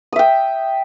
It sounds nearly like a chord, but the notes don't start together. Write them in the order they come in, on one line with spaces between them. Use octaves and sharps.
D#6 E5 G5